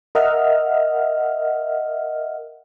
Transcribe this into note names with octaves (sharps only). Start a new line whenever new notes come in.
A#4 D#5 E5 F#5 F6